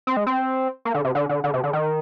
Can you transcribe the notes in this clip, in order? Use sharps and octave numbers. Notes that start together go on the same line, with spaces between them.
C4
G#3
C4
A#3
D3
C3
D3
D3
D3
C3
D3
D#3